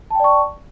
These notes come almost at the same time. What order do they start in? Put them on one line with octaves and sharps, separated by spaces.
A5 G5 D5 C#6